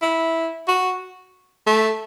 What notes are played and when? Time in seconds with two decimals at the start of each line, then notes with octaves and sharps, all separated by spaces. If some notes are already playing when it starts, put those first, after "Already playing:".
0.02 E4
0.68 F#4
1.66 A3